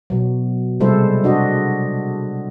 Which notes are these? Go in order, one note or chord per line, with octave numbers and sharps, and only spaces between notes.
B2 F#3
C3 G3 G#3 E4 A4 C5
D4 F#4 D#5